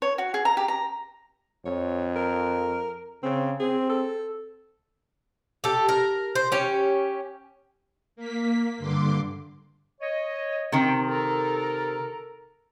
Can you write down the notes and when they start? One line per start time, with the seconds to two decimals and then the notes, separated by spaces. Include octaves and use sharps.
0.02 C#5
0.18 F#4
0.34 G#4
0.45 A#5
0.57 G4
0.68 A#5
1.66 F2 C#5
2.16 A#4
3.23 C#3 C4
3.60 C4 G#4
3.90 A4
5.64 G4 A4
5.89 A#4
6.35 C5
6.52 C#4 G4
8.16 A#3 B6
8.78 G2 D3 C6 D6
10.01 C#5 D#5
10.72 C3 D#3 G5
11.08 A4 A#4